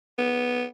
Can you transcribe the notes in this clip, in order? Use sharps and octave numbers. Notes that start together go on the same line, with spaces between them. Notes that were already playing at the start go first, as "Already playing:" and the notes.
B3